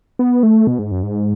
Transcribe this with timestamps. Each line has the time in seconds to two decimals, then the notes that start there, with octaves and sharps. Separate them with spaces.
0.19 B3
0.43 A3
0.67 B2
0.79 G#2
0.91 F#2
1.03 G#2